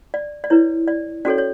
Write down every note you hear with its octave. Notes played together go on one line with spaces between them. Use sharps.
D5
D5
E4 B4 C#5
D5
C#4 F#4 A4 C#5 D5
C#5